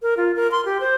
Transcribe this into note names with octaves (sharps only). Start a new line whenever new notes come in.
A#4
F4
A#4
C6
G4
C5